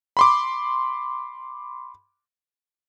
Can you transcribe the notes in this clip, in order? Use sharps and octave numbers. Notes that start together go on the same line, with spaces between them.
B5 C6 D6